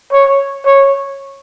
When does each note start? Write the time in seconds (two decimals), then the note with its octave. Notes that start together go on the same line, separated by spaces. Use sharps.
0.12 C#5
0.65 C#5